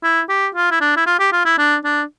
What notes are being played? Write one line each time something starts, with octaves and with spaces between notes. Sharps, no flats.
E4
G4
F4
E4
D4
E4
F4
G4
F4
E4
D4
D4